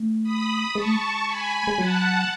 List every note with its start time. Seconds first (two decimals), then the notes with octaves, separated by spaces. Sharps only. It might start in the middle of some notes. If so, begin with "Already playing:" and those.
Already playing: A3
0.23 B5 D#6
0.75 G#3 A5 C#6
0.85 A3
0.95 G#3
1.26 G#5 B5
1.67 G#3
1.78 F#3 F#5 A5